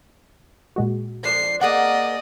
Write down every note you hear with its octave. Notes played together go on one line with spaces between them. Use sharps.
A#2 G#3 F#4
F3 D4 C5 C7
A#3 G#4 D5 D#5 F#5